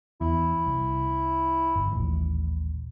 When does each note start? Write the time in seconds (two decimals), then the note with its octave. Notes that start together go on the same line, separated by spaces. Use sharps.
0.21 E2 E4
0.67 C2
1.76 G1
1.91 D#1 A1